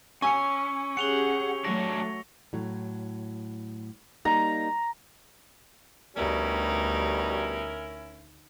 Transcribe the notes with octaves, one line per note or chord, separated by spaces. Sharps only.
C#4 G#5 C#6 E6 C#7
C#4 G4 G#4 F#5 C#7 F7 G7
F#3 A3 D4 F#4 C#5 A#6
A2 F#3
G3 A#3 D#4 A#5
D2 B2 G3 C#4 D#4 E4 A#4